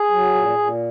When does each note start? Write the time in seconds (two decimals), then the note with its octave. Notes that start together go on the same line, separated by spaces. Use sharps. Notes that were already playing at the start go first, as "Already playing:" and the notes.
Already playing: G#4
0.10 F#3
0.34 A#2
0.58 A#2